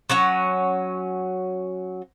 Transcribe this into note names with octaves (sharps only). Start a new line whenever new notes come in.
F#3 C#4 F#5